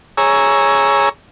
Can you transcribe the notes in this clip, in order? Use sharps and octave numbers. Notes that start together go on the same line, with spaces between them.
G#4 C#5 A#5 E6